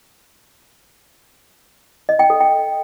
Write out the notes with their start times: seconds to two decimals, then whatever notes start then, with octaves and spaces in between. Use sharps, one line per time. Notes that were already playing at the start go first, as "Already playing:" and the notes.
2.09 D#5
2.19 G5
2.30 A4
2.40 G5